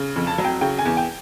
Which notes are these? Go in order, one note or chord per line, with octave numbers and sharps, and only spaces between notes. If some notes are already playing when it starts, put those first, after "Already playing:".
Already playing: C#3
F2
A5
F#3
G5
C#3 G5
G#5
E2
G5